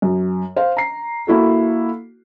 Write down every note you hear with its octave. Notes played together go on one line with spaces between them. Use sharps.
F#2
C5 F5
A#5 C7
A#3 E4 F#4 A4